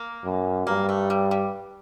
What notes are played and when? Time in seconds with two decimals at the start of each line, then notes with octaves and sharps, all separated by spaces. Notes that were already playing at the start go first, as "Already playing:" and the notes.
Already playing: A#3
0.24 F#2
0.67 G2 A#3
0.89 A3
1.10 G3
1.31 G3